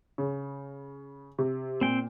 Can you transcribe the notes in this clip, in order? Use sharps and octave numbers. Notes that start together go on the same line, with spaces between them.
C#3
C3
A#2 C4 G5